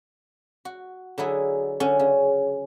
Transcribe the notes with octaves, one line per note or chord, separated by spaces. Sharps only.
F#4
D3 F#3 E4 G#4
D3 C#4
C#3